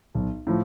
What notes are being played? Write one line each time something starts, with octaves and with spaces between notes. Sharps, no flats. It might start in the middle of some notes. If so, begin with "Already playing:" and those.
B1
A2 F3